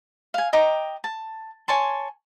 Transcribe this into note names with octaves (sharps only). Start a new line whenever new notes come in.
F5 G#5
D#5 G5 A#5 D6
A5
C#5 G#5 A5 C6